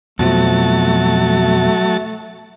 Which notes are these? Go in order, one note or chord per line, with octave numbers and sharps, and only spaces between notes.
F2 B2 F3 F#3 A3 A5